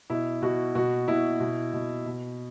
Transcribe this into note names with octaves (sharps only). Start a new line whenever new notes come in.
B2 E4
B2 F#4
B2 F#4
B2 E4
B2
B2
B2